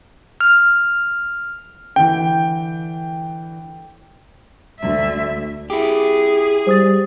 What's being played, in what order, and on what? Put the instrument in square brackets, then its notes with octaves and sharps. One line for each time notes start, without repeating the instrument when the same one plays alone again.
[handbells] F6
[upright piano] D3 E3 [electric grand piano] G5
[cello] D2 E5
[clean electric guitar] E4 G4 [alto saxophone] G#4
[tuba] G3 [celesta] C5 D#6 A6